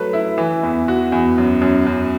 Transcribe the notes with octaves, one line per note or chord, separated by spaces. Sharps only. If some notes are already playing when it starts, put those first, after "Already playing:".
Already playing: F#3 A3 B4
E4
E3
E2
F#4
E2
F#2
F#2
F#2